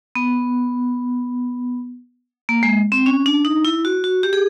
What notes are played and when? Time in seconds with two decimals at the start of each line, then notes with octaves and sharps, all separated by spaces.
0.15 B3
2.49 A#3
2.63 G#3
2.92 C4
3.06 C#4
3.26 D4
3.45 D#4
3.65 E4
3.85 F#4
4.04 F#4
4.23 G4
4.33 G#4